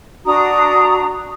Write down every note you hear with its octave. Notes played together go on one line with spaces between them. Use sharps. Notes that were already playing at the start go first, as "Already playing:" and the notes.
D4 F#4 A#5 D#6